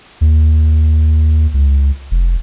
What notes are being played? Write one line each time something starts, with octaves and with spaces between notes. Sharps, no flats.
D#2
C#2
F1